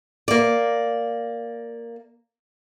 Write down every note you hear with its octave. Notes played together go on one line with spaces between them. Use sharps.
A#3 D5